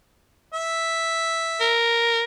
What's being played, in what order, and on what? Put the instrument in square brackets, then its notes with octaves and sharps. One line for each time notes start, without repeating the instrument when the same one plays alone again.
[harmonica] E5
[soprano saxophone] A#4